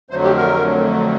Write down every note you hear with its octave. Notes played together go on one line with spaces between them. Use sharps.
F2 D3 F#3 A3 C5
G4
A#4